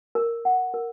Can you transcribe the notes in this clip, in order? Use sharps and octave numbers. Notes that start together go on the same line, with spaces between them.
A#4
F#5
A#4